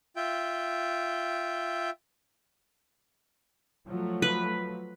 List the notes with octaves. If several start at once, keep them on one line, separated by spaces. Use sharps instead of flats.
F4 E5 G5
F3 F#3 A3
B4